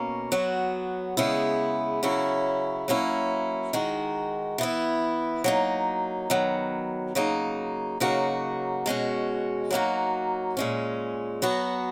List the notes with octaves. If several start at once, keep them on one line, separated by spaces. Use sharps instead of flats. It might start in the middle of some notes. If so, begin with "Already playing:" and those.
Already playing: B2 A#3 C#4
F#3 B3 F#4
C#3 G#3 B3 E4
C#3 F#3 C#4 E4
F#3 A#3 C#4 E4
D#3 G#3 D#4 F#4
E3 B3 E4
F#3 A#3 D#4
D#3 F#3 B3
C#3 F#3 A#3 D#4
C#3 F#3 A#3 D#4 F#4
B2 G#3 C#4 F#4
F#3 A#3 D#4 F#4
A#2 G#3 C#4
F#3 B3 F#4